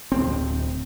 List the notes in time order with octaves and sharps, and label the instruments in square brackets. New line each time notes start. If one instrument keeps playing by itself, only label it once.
[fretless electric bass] D1 G1 C4